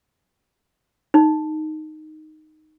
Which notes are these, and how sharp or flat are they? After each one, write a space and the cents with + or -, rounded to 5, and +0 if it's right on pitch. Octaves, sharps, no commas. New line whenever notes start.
D#4 -5